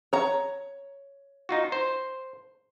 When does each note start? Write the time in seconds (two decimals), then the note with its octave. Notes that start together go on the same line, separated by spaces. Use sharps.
0.13 C#5 A#5
1.49 D#4 F4 F#4
1.72 C5